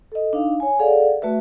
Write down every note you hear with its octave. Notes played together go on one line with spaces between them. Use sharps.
A4 D#5
D4 D#4 F5
C#5 G#5
G#4 A4 D5 F5 F#5
A3 F#4 B4 E5